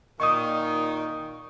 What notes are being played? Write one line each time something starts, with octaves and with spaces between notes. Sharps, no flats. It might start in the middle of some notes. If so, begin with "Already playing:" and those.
A#2 D#3 C#6 D#6